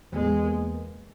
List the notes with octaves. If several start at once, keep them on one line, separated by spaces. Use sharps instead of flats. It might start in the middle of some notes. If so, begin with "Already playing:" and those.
E2 G#3
A#3